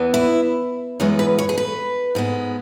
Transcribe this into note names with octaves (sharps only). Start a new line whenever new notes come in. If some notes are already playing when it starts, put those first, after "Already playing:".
Already playing: E2 E3 B3
E4
F#2 E3 G#3 B3 C#5
B4
C#5
G#4
B4
G#2 G#3 B3